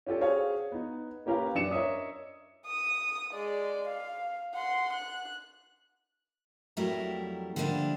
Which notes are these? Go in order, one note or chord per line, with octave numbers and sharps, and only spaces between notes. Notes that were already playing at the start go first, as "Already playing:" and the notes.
C#4 F4 G4 A4 D5
F#4 G#4 C5 C#5 F5
B3 D#4
A#3 C#4 G4 A#4 B4 F5
F#2 D4 C#7 E7
A#4 C#5 D#5 E5 D#6
D#6
G#3 D5
F5
F#5 C6
F#6
F2 F#3 G3 A3 E4 A#4
D3 F3 G3 A#3 D4 E4